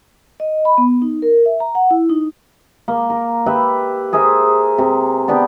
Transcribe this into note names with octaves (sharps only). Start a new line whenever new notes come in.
D#5
B5
B3
D#4
A#4
E5
A#5
F#5
E4
D#4
A#3
A#4
G4 B4 E5
G#4 A#4 C5 E5
C3
B3 D4 G4